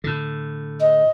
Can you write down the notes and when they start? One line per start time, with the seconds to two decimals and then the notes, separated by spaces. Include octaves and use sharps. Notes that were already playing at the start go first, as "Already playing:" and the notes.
0.04 A2 D3
0.81 D#5